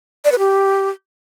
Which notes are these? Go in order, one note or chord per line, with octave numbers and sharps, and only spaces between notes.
D5
B4
G4